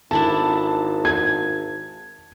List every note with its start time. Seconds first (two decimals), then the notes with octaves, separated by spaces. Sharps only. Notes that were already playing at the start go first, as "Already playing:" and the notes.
0.11 G#1 D4 E4 A4 A5
1.05 G#6